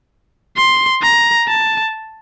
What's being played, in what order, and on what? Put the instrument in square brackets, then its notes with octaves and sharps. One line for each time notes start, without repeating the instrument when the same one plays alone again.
[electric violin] C6
A#5
A5